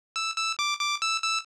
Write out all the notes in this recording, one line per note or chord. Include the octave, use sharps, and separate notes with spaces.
E6
E6
D6
D6
E6
E6